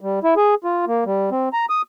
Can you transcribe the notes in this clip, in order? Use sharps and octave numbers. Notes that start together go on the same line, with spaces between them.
G3
E4
G#4
F4
A#3
G3
C4
A#5
D#6